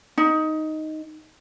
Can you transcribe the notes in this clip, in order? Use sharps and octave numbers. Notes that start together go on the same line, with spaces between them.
D#4